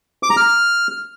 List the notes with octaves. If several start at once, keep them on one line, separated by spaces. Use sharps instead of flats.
D6
A#5
F6